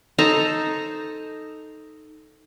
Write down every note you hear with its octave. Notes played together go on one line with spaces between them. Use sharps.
D#4 A4 C5 A#5